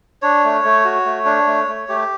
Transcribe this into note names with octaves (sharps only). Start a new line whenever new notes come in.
D4 C#5
A3
A3
F#4
A3
D4
A3
A3
A3 G4